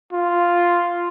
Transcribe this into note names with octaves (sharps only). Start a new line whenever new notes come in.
F4